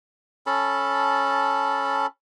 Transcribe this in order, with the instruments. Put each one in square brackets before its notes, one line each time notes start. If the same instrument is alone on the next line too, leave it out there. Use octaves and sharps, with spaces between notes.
[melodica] C#4 A4 A5 B5